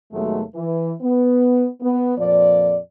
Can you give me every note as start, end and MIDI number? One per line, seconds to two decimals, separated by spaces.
0.12 0.42 39
0.12 0.42 47
0.12 0.42 54
0.12 0.42 56
0.12 0.42 57
0.55 0.91 52
1.02 1.66 59
1.81 2.14 59
2.18 2.77 41
2.18 2.77 46
2.18 2.77 53
2.18 2.77 74